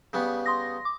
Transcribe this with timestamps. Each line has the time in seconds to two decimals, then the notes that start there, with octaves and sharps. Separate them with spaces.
0.13 C#3 G3 B3
0.46 C6 D#6 A#6
0.85 D6